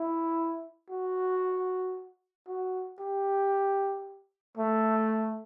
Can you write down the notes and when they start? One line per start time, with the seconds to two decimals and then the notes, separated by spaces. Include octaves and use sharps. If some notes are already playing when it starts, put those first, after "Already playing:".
Already playing: E4
0.90 F#4
2.48 F#4
3.00 G4
4.57 A3